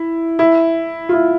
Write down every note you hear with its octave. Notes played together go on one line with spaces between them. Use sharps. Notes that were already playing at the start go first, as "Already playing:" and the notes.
Already playing: E4
E4
F4
E4